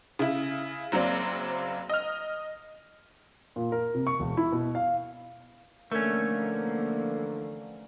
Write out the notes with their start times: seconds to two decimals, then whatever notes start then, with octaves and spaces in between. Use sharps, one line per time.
0.19 C#3 E4
0.92 F#1 F#3 A#3 C4 D5
1.90 D#5 F6
3.56 A#2
3.72 A#4
3.94 C3
4.07 C#6
4.20 E1
4.37 E4
4.52 B2
4.75 F5
5.92 D3 E3 F3 A3 A#3 C#4 A#4 G#6